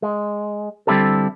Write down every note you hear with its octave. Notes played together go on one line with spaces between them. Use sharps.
G#3
D3 G3 C4 E4 G4 A4